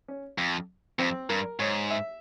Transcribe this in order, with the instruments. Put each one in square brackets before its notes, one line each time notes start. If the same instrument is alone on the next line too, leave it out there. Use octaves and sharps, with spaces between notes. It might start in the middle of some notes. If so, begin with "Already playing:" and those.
[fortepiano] C#4
[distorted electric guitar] F2
[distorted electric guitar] F2 [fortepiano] C4
[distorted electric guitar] G2 [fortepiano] A#4
[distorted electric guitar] G#2 [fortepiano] C#5
[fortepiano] E5